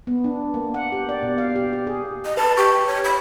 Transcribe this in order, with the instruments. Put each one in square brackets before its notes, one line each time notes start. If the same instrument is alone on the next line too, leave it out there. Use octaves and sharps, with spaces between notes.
[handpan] B3
D4
A#3
F#5
G4
D5
B2
F5
G4
G4
G#4
[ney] D#5
[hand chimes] B4 [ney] A5
[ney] G4 [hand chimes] C#6
[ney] C#5
B5